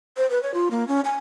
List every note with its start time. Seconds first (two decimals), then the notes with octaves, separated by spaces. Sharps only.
0.17 C5
0.30 B4
0.43 C#5
0.54 F4
0.71 A#3
0.88 C#4
1.05 G#5